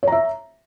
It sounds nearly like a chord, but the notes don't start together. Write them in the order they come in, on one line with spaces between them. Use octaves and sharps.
C#5 A#5 E5